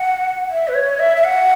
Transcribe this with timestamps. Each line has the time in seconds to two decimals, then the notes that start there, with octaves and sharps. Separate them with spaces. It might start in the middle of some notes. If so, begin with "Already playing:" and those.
Already playing: F#5
0.50 E5
0.68 B4
0.74 C#5
0.99 E5
1.17 E5
1.24 F#5